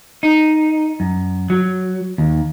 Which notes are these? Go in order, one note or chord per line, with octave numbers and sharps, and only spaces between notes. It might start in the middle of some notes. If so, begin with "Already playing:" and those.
D#4
F#2
F#3
D#2